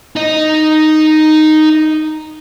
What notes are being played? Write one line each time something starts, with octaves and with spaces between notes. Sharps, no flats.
D#4 D#5